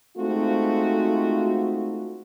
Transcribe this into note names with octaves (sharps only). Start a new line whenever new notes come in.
G#3 A3 C4 D#4 F4 F#4